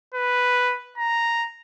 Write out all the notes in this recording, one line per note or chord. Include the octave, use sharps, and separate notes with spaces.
B4
A#5